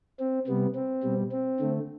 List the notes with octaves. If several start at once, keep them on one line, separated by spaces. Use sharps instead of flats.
C4
C3 G3 B3
C4
B2 G3
C4
D3 A3